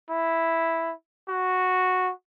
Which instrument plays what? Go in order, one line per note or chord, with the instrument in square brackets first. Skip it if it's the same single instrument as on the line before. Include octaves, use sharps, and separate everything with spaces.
[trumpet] E4
F#4